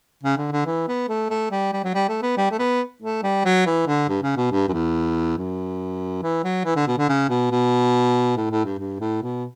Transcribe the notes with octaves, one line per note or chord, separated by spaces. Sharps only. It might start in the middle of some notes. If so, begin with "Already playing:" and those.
C#3
D3
D3
E3
B3
A3
A3
G3
G3
F#3
G3
A3
B3
G3
A3
B3
A3
G3
F#3
E3
D3
G2
C#3
B2
G2
F#2
E2
F#2
E3
F#3
E3
D3
B2
D3
C#3
B2
B2
A2
A2
G2
G2
A2
B2